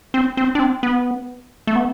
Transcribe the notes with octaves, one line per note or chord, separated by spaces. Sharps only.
C4
C4
D4
C4
B3
A3
B3